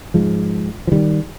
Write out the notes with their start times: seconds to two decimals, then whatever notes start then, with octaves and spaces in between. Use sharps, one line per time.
0.14 G#2 F3 G#3
0.87 F3
0.92 D#3 G3